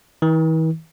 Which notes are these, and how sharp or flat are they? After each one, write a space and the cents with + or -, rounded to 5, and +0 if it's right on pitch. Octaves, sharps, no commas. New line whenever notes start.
E3 -45